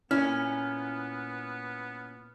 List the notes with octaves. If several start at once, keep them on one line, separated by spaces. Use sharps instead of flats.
A#2 B3 C#4 E4 F6